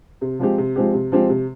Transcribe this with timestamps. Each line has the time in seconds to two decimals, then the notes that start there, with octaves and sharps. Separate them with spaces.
0.21 C3
0.39 F3 G#3 C4 G4
0.58 C3
0.76 F3 G#3 C4 G4
0.94 C3
1.12 F3 G#3 C4 G4
1.29 C3